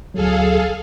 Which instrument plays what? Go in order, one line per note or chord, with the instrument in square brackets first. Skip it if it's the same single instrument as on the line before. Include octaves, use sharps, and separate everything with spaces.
[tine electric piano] D2 F#3 [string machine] G#4 A4 F5